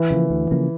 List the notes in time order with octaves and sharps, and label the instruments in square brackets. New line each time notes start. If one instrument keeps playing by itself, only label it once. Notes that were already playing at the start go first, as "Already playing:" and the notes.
Already playing: [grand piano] E3
[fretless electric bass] C#3 F3 A#3
D2
C#3 F3 A#3